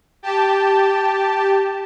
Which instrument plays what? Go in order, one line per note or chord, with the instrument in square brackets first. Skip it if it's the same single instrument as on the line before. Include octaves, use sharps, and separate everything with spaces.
[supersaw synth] G4 A5